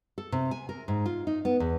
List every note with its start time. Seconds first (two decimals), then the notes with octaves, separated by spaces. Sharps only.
0.18 A4
0.32 C3
0.51 G#5
0.69 A#4
0.88 G#2
1.06 F4
1.27 D#4
1.45 B3
1.60 E2